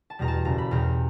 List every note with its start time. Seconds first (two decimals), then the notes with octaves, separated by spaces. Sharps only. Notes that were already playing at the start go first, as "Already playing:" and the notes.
0.10 A5
0.19 E2 B2 G3 A#5
0.28 A5
0.45 F#1 A#5
0.58 B5
0.71 E2 B2 G3 A#5